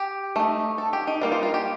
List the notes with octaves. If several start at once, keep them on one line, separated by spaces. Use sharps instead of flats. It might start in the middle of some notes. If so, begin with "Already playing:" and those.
Already playing: G4
A3 D#4
A4
G4
D#4
G3 A#3 D#4
F4
F4
G4